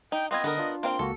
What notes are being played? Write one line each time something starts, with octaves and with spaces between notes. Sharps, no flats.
D#4 G5
B3 C4 F4 D#5 C6 G#6
D3 B3 A4 A#4
D4 F4
A#3 C4 F5 C6
C#2 A#3 F#4 A4